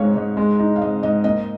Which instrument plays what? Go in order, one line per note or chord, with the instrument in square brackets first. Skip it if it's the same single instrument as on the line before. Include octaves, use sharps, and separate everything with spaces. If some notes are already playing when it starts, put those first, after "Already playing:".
Already playing: [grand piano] G#2 G#3 D#4 [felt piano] C#5 D#5 F5
[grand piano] G#2 [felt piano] D#5
[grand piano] G#3
D#4
[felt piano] F5
[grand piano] G#2 [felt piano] D#5
[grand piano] G#2 [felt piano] D#5
[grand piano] A#3 [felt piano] D#5